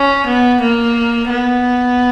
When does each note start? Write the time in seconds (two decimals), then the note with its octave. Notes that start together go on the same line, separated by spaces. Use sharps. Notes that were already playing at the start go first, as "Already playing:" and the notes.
Already playing: C#4
0.26 B3
0.61 A#3
1.30 B3